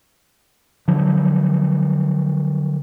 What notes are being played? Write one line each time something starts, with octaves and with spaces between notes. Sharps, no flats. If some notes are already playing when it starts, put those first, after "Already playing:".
D3 F3 F#3